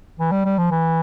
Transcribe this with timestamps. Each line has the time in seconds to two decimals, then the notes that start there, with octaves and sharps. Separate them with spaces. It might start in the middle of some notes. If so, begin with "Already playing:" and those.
0.20 E3
0.32 G3
0.45 G3
0.58 F3
0.71 E3